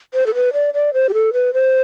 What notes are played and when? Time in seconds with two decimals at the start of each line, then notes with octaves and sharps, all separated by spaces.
0.14 C5
0.26 A4
0.34 B4
0.53 D5
0.74 D5
0.94 C5
1.09 G4
1.14 A4
1.33 B4
1.53 C5